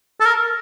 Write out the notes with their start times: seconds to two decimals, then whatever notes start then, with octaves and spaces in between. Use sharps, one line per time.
0.20 A4
0.26 A#4